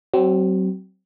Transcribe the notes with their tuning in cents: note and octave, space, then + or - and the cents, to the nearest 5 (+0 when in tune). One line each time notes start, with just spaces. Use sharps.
F#3 +35 C4 +0